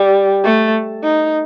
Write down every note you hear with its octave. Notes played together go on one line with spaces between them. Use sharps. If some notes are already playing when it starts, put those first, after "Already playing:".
Already playing: G3
A3
D#4